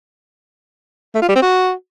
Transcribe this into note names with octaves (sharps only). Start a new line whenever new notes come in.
A3
F4
G3
C4
F#4